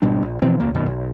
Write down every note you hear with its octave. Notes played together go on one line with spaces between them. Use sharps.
G#1 B2 G3 D4
A#1
B2 E3 F3 C4
E1 C#2 A#3
E1 F#2 B2 D#3
B1